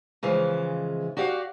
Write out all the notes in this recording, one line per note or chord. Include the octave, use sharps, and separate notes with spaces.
C#3 E3 F3 G#3
F#4 G4 D5 F5 F#5